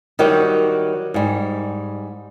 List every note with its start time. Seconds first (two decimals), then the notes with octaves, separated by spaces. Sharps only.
0.19 D#3 F#3 G3 F#4 G4
1.14 G#2 G3